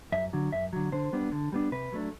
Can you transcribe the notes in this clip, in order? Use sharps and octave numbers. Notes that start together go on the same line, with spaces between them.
F#2 E5
D3 F#3
F#2 E5
D3 F#3
D3 C5
G3 B3 D4
D3
G3 B3 D4
C3 B4
F#3 A3 D4